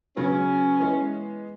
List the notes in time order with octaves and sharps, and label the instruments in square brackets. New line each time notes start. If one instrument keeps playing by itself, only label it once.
[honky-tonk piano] C#3 F#3 B3 [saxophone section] C#4
[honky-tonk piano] E3 G#3 B3